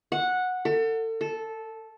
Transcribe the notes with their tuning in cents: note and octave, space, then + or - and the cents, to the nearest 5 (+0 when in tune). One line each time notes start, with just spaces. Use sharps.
F#5 -10
A4 +35
A4 -10